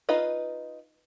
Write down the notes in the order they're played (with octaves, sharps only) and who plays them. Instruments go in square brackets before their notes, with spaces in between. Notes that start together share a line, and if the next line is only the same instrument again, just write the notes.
[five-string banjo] D#4 F4 B4 D#5 F5